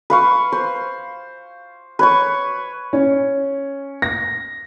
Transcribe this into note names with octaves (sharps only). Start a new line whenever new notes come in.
B4 F5 C#6
C5
B4 C#5 C#6
C#4
A#6